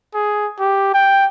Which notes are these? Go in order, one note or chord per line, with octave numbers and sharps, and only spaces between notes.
G#4
G4
G5